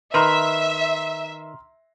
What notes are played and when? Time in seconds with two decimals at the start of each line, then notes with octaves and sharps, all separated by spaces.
0.14 D#3 B4 E5 A#5 C6 F6